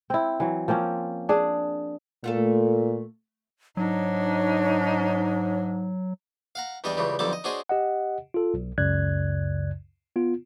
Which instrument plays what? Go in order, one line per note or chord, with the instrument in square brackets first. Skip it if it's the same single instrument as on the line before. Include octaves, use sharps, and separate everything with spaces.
[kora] C4 E4
E3 F#3
F3 A#3 C4 C#4
D4 G#4
[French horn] A#2 [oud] A3 F4 A4
[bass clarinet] G#2 [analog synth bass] F#3 [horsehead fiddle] D4 D#4 [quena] C#5
[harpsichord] F5 F#5 A#5
E2 G3 D4 D#5 G5
C#2 C#3 E3 G3
B1 F2 D3 G3 A4 D6
D#5
D4 F#4 G#4 C5 C#5 D#5
[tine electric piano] G4 D#5 F#5
F4 A4
B1
C#2 F#2 C#3 D5 F#6 G#6
B3 F4